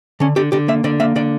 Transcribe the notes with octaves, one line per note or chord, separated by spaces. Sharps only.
D3 C#4
D3 G4
D3 G4
A#3 E5
D3 D5
A#3 E5
D3 D5